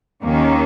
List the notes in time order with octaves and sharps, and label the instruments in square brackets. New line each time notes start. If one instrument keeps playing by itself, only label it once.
[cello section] D#2 D#3 A#3 C#4